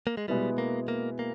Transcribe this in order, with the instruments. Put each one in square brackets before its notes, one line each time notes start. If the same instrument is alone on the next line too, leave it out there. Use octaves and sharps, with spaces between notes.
[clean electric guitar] A#3
G#3
[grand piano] B2 G#3 B3 E4 [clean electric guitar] G3
[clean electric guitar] A#3
A#3
A#3